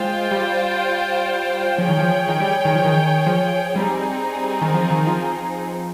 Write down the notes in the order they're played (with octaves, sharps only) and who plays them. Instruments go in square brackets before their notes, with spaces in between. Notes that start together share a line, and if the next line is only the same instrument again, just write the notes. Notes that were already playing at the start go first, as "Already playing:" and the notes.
Already playing: [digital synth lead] G#3 [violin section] F4 C5 G5
[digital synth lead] G3
[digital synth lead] F3 [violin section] G#4 C#5 G5
[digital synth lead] D#3
F3
D#3
G3
D#3
F3
D#3
F3
[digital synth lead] G3 [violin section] C4 D#4 G#4
[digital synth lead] D#3
F3
D#3
F3